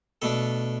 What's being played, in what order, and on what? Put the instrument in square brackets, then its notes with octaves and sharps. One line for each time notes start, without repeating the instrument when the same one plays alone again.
[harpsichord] B2 A3 D4 A4